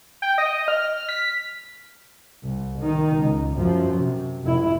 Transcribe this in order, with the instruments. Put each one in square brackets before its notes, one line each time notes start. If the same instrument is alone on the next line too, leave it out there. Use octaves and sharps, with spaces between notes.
[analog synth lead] G5
D#5
F6
B6
[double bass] C2
D#3 D#4
C#2
F#2 F3
C3
F1 E4